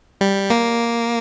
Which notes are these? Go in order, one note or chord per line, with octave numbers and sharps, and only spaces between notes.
G3
A#3